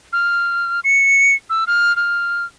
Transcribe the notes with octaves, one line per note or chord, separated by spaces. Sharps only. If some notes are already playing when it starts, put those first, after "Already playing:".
F6
C#7
E6
F6
F6